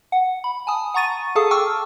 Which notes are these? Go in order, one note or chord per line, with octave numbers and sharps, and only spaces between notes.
F#5
B5
G#5 A5 D#6
F#5 A#5 C#6 A6 D#7
G#4 A4 F5 A5 D#6
G5 C#6 D6 E6 F6